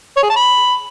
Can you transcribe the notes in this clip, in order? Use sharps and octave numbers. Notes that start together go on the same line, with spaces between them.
C#5
G#4
A5
B5